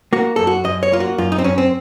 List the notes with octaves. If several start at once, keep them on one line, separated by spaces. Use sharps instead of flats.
A#3 F#4
F#2 A4
F#4
F#2 D#5
C#5
A#3 F4
F#4
F#2 F4
D#4
C4
F#2 C#4
C4